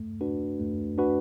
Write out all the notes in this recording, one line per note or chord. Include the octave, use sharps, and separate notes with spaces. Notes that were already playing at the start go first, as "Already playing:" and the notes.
Already playing: A3
D4 F#4 B4
A3
D4 F#4 B4